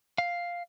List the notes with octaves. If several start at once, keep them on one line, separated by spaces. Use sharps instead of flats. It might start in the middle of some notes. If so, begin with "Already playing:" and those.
F5